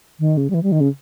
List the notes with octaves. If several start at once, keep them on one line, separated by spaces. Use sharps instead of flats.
D#3
C#3
G3
E3
G3
D#3
C#3